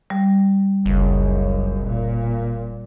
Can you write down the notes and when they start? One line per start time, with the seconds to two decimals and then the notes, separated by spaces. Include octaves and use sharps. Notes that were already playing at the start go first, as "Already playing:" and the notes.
0.10 G3
0.86 F#1 C#2 F#2
1.84 A#2